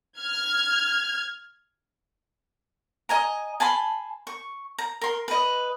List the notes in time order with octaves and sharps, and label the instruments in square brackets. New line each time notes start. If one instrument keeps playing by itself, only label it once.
[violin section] F6 G#6
[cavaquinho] D#5 G#5 A#5
G#5 A5 B5 C6
C#6
A#5
A#4 C6
B4 D#5